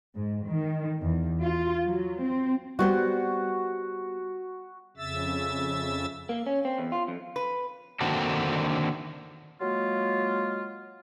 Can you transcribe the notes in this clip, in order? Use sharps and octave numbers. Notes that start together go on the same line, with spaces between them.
G#2
D#3
E2
F4
F#3
C4
G3 B3 F#4 C5
F2 C#3 E5 E6 A6
A#3
C#4
C4
E2
F4
F2
B4
D3 D#3 A#3 C4 F#4 A4
F#3 G#3 A#3 F4